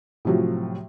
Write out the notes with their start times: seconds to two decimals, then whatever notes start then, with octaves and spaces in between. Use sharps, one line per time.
0.25 A2 C3 F3 F#3